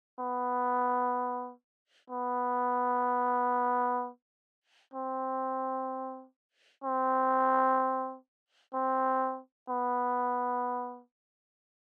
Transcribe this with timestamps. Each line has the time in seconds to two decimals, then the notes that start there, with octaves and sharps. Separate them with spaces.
0.20 B3
2.10 B3
4.94 C4
6.84 C4
8.74 C4
9.69 B3